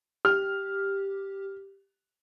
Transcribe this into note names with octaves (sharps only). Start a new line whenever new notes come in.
G4 F6